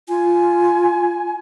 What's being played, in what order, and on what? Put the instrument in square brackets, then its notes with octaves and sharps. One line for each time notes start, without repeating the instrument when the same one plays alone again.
[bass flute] F4 [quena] G#5